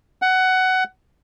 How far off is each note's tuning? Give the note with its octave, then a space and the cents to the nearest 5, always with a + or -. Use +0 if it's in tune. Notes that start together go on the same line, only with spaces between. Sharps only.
F#5 +15